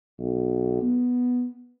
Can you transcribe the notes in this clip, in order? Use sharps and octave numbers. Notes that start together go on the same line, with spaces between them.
B1
B3